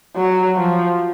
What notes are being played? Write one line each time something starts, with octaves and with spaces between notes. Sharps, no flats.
F#3
F3